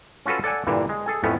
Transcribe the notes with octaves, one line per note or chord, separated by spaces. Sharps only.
C#4 F4 F#4 A4 B4
A4 D5 F#5 G#5
G2 A#2 D3 E3
G#3
G#4 A4 G#5
F2 A2 A3 B3 C#4